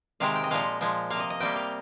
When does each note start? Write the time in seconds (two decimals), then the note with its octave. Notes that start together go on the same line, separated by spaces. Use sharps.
0.20 C3 D#3 G#3 F5
0.35 G5
0.44 D#5
0.51 A#2 F3 G#3 F5
0.81 A#2 F3 G#3
1.10 C3 F3 A#3 F5
1.20 D#5
1.30 D#5
1.40 C3 G3 A#3 G5
1.56 F5